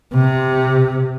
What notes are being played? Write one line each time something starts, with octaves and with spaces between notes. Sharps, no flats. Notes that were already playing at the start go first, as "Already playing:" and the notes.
C3